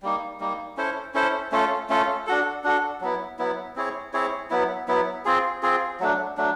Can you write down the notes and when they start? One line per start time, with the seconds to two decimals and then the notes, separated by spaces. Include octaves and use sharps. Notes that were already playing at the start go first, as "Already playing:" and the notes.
0.02 G3 A#3 D#4
0.40 G3 A#3 D#4
0.77 C#4 E4 A4 C5
1.14 C#4 E4 A4 C5
1.52 A3 C#4 F4 A4
1.90 A3 C#4 F4 A4
2.27 D4 F#4 A4
2.64 D4 F#4 A4
3.01 F#3 B3 E4
3.39 F#3 B3 E4
3.76 C4 E4 G#4 C#5
4.13 C4 E4 G#4 C#5
4.50 F#3 B3 E4
4.88 F#3 B3 E4
5.25 C4 F4 G#4
5.63 C4 F4 G#4
6.00 F#3 A3 D4
6.37 F#3 A3 D4